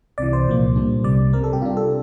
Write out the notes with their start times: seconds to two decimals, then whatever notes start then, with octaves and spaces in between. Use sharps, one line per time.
0.18 C2 C3 E3 D5
0.33 C5
0.47 C2 A#2 F3 A#3
0.76 A#2 G3 A#3 D4
1.04 C2 C3 G3 D5
1.33 C3 G3 C4 A#4
1.44 A4
1.53 G4
1.62 C3 G3 D4 F4
1.77 A4